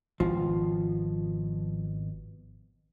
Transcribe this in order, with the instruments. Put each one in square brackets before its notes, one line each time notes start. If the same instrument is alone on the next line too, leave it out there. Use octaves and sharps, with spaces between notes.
[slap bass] G#1 B2 [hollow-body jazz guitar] F3